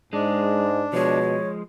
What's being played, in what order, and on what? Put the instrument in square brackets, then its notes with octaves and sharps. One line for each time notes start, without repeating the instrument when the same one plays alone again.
[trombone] G#2 [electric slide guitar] G#3 [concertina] D4
[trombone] B2 [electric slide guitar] F3 G#3 [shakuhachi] C#5